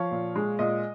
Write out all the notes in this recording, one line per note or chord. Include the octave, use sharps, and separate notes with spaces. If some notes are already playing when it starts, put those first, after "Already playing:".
Already playing: F3 C#5 F5
A#2
G#3
A#2 D#5